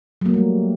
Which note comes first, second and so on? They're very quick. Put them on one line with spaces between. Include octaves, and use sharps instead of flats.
F#3 A#3 A3 G3